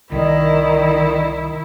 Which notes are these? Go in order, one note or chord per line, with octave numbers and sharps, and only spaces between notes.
C2 D#3 E4 D5